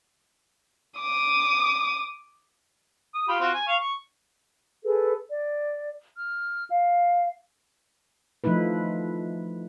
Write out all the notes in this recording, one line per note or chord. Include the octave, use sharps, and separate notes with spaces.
D6 D#6
D#6
F4 G4 B5
C4 F4 F#4
G#5
F5 C#6
C#6
G#4 A4 B4
D5
F6
F5
F3 A3 D#4 E4 B4